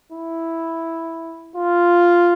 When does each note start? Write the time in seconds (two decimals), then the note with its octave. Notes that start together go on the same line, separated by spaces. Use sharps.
0.12 E4
1.56 F4